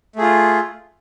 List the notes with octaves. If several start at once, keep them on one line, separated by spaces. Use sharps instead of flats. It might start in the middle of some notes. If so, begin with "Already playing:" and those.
A3 F4 G#4